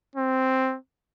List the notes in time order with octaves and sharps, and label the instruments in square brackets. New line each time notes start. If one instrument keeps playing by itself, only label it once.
[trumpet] C4